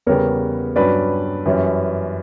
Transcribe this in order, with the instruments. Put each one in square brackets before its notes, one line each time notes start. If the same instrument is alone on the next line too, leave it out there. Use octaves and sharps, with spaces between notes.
[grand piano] E2 C#3 G3 B3 A#4 C#5
G2 F#3 C#4 B4 D5
F#2 E3 G3 C#4